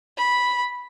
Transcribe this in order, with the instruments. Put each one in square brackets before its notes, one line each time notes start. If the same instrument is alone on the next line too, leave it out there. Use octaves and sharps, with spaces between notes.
[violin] B5